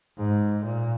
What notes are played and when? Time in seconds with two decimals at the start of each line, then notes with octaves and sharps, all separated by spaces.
0.17 G#2
0.64 A#2